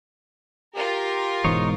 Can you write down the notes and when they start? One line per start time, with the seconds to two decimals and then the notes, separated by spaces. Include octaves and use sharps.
0.75 F4 G4 A#4
1.44 E1 E2 G#2 D#4 C#5